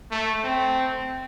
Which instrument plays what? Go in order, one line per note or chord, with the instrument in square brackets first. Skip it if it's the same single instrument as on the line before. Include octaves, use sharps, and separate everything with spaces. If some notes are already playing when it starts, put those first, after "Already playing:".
[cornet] A3
C4